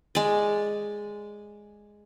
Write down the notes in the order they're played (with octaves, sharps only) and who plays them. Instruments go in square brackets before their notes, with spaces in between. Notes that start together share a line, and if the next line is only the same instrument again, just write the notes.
[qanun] G#3 D5